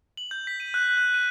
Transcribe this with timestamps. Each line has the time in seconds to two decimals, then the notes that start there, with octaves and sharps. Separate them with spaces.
0.17 F#7
0.31 G6
0.47 B6
0.60 D#7
0.74 F#6
0.97 F#6
1.14 D#7